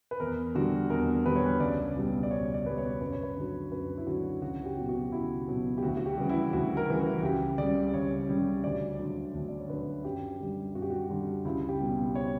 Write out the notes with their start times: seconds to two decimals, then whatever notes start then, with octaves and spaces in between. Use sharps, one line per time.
0.11 B4
0.20 E2 A#4
0.55 D3 G3 F#4
0.90 E2 A#4
1.25 D3 G3 B4
1.36 C#5
1.46 B4
1.60 C#2 D5
1.96 B2 G3
2.23 D5
2.31 C#2 C#5
2.54 D5
2.66 B2 G3 B4
2.78 C#5
3.01 F#2 B4
3.12 C#5
3.23 B4
3.36 D3 F#3
3.72 F#2 B4
3.98 E4
4.07 D3 F#3 F#4
4.42 C#2 F#4
4.65 G4
4.77 B2 F#3
4.89 F#4
5.12 C#2 E4
5.48 B2 F#3
5.78 G4
5.83 D2 F#4
5.97 F#4
6.06 G4
6.18 C#3 E3 G3
6.29 E4
6.53 D2 F#4
6.77 A#4
6.88 C#3 E3 G3
7.00 F#4
7.23 C#2 G4
7.58 C#3 G3 D5
7.93 C#2 C#5
8.29 C#3 G3
8.64 D2 D5
8.99 D3 F#3
9.34 D2
9.48 D5
9.59 C#5
9.70 D3 F#3 B4
10.04 F#2 G4
10.40 D3 G3
10.75 F#2 F#4
10.82 G4
10.90 F#4
11.10 D3 G3
11.45 C#2 E4
11.69 G4
11.81 B2 G3
12.15 C#5